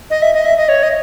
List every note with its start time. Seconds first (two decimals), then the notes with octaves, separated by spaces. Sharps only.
0.10 D#5
0.22 E5
0.34 D#5
0.45 E5
0.57 D#5
0.69 C#5
0.83 D#5